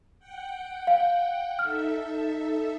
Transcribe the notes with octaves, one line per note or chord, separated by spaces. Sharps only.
F#5 G5
F5
D#4 A4 E5 F6